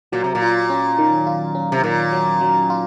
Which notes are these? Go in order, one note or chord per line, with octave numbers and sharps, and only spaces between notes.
A#2 F#3
C3
A#2
F4
C#4
D#3
F4
C#4
C3
A#2 D#3
F#3
F#3
F4